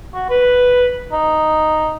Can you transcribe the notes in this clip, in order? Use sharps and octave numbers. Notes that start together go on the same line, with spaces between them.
F#4
B4
D#4